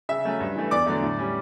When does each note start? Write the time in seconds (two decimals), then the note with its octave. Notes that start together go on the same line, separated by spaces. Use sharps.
0.09 C#3 E5 E6
0.25 F#3 A3 C#4
0.40 G2
0.56 E3 A3
0.71 E2 D5 D6
0.86 D3 F#3 A3
1.03 A2
1.19 G3 C#4